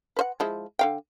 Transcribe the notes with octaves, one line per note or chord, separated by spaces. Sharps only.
B4 C5 F#5
F3 G#3 E4
D3 F5 G5